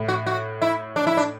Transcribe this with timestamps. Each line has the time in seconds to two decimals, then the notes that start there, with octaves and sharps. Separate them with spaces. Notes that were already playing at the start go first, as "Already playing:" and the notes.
Already playing: A2
0.08 F#4
0.26 F#4
0.62 E4
0.96 D4
1.07 E4
1.17 D4